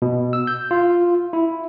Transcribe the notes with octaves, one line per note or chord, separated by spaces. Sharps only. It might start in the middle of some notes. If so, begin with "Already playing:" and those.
B2
E6
G6
F4
E4